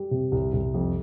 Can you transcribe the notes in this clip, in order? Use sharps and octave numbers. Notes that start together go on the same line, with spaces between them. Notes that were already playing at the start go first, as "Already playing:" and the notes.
Already playing: G3
C3
C2
C2
F2